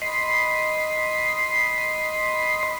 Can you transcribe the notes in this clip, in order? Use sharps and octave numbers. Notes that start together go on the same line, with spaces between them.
D#5 B5 C6